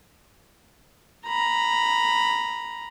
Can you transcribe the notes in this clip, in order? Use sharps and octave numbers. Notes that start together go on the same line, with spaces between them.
A#5 B5